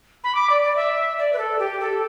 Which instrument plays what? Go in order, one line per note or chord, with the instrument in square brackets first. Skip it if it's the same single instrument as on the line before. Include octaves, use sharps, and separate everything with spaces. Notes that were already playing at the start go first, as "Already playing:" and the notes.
[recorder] B5
D6
D5
D5
E5
D5
B4
A4
G4
A4